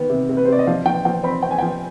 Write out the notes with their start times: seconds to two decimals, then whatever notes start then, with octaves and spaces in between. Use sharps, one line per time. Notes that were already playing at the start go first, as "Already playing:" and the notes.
Already playing: D#3 B3
0.10 C3
0.29 C3
0.37 B4
0.45 C5
0.48 C3 D5
0.59 D#5
0.67 F3 F5
0.86 F3 G5
1.05 F3 G5
1.23 C4 B5
1.43 C4 G5
1.51 G#5
1.59 F3 G5